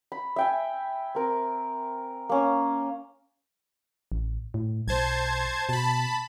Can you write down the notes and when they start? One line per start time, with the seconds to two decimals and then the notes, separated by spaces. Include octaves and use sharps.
0.12 B5
0.36 E5 G5 G#5
1.15 C4 A#4
2.29 A#3 C#4
4.12 A1
4.54 A2
4.88 B1 C5 A5 G#6
5.69 B2 A5 B5